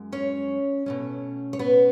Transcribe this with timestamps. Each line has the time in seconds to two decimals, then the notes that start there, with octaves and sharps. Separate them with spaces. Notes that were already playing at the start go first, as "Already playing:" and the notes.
Already playing: F#2 G#3
0.13 C#4 C#5
0.86 B2 A3 C#4
1.53 C#5
1.59 B3 B4